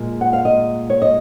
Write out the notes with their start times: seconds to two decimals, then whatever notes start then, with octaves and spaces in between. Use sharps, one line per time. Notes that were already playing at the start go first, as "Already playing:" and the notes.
Already playing: A#2 G#3
0.21 F#5
0.33 F5
0.45 D#5
0.90 C#5
1.02 D#5